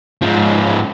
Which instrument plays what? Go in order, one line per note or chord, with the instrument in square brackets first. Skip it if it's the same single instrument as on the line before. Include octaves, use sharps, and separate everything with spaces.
[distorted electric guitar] G#2 F3